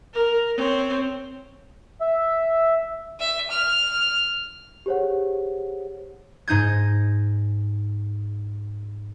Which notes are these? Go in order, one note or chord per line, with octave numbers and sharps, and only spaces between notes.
A#4
C4 C#5
E5
E5
F6
G4 G#4 C5 C#5 F#5
G#2 D#4 G6 G#6